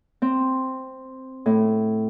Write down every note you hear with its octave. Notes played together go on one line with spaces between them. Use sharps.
C4
A2